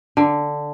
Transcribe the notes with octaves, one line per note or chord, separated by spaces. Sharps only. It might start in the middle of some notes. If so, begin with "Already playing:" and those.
D3